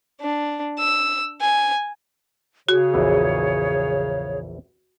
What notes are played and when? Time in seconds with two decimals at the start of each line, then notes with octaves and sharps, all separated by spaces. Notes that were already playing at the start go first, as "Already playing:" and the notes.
0.21 D4
0.79 E6
1.41 G#5
2.69 C#3 F#4 G#4 C#5
2.94 A#1 E2 E3